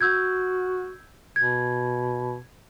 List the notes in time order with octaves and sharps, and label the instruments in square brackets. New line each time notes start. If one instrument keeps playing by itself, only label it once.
[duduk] F#4 [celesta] E6 G6 G#6
[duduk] B2 [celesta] G#6